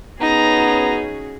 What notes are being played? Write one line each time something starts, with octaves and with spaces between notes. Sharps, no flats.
B3 C#4 D#4 F#4 G#4 A#5